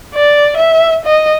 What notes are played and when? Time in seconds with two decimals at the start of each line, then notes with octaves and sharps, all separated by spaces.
0.14 D5
0.57 E5
1.05 D#5